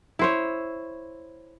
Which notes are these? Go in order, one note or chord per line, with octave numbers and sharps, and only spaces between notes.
E4 C5 C#5